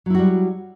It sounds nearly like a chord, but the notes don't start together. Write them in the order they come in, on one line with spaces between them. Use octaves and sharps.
F#3 E4 F#4 G3